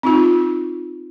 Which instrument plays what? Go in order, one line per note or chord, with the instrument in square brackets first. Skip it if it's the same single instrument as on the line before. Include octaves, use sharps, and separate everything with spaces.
[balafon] C4 D#4 F4